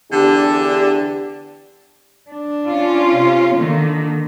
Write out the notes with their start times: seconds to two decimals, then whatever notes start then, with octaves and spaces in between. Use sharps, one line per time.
0.12 E2 D3 D4 G4
2.31 D4
2.68 C#4 F4
3.15 C3
3.55 D3 D#3 A#3